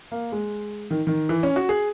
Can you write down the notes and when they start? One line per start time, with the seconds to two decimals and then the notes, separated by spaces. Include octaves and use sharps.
0.12 A#3
0.32 G#3
0.91 D#3
1.07 D#3
1.29 E3
1.43 C#4
1.56 F#4
1.69 G#4